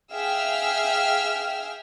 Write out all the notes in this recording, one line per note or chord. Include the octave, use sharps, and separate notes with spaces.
G#4 E5 F5 G5 E6 F6